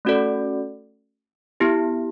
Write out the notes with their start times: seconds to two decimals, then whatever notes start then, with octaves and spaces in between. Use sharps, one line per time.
0.05 A3 C#4 F#4 A4 D5
1.60 B3 E4 G4